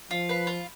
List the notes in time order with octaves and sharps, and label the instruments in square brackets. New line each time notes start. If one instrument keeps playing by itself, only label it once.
[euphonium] F3 [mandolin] F4
[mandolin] B4 F5
F4